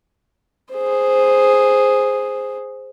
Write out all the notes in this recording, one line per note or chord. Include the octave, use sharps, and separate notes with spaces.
G#4 C5